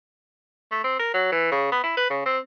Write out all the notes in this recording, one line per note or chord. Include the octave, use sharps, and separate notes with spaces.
A3
C4
A#4
F#3
E3
C#3
B3
E4
B4
C#3
C4